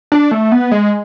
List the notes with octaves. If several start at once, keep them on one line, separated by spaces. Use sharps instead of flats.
D4
A3
B3
G#3